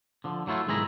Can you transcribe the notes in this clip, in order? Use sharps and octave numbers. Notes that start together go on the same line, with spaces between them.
D3 F3
F#3 A3 E4 F4
B1 G#2 D#3 G#3 E4 A#5